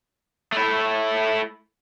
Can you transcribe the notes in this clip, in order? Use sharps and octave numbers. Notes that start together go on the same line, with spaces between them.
A3 E4